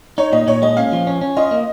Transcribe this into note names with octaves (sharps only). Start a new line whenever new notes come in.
D#4 C#5
A#2 D#5
A#2 C#5
G#3 D#5
C#4 F5
F3
C#4
C#4
F4 D#5
A#3